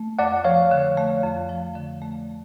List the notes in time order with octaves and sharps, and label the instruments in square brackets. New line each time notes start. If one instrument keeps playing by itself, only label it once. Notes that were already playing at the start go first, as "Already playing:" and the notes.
Already playing: [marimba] A3
[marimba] F2 [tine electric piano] D5 F#5
[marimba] F3 [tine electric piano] C#5 F5
[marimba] D3
A3
F2
F3
D3
A3